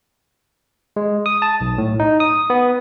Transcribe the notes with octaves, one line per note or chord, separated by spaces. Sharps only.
G#3
D#6
A5
B1
A2
D#4
D#6
B3